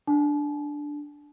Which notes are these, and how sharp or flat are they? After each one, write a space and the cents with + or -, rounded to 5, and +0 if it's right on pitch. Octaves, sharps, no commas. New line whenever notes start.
D4 +0 A5 -45